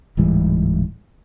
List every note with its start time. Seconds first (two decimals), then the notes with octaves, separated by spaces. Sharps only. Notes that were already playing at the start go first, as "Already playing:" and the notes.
0.17 D1 G#2 E3 G3